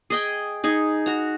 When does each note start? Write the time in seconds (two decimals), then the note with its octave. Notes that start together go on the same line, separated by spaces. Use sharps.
0.10 G#4 D#5 G5
0.64 D#4 G#4
1.06 F#4 A#5